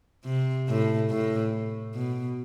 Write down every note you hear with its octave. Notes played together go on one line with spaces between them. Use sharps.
C3
A2
A2
B2